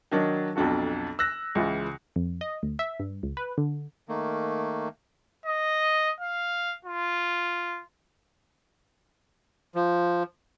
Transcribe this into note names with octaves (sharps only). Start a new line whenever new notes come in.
D#3 F#3 D4 D#4
B1 F2 D4 F#4 A4
E6 F#6 A#6
C#2 C#3 E3 F4
F2
D#5
D2
E5
G2
C#2
B4
D3
D#3 A3 A#3
D#5
F5
F4
F3